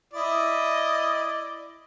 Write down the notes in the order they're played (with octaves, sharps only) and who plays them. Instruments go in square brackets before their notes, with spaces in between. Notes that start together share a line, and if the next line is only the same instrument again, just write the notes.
[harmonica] E4 D5 D#5